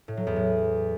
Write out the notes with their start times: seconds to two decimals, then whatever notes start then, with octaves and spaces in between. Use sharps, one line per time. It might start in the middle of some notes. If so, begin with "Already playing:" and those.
0.08 A2
0.17 F#3
0.27 E2
0.36 A2